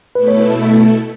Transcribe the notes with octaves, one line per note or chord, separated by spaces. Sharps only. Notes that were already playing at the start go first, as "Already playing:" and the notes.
B2 A3 E4 A4 B4
C#5
B4